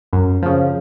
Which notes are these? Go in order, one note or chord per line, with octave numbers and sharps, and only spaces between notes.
F#2
C#3 F3